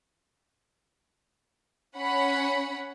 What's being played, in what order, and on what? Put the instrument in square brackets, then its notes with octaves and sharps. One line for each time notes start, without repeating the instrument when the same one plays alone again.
[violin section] C#4 F#5 B5